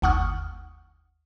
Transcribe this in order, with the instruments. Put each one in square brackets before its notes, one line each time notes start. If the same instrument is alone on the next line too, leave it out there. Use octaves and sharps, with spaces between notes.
[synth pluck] G1 D#2 F#5 C#6 D#6 F6